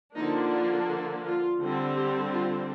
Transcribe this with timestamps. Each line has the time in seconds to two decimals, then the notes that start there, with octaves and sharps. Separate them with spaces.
0.15 D3 F3 A#3 D4 D#4
0.51 F4
1.24 F4
1.60 D3 G3 C4
1.95 G4
2.32 F4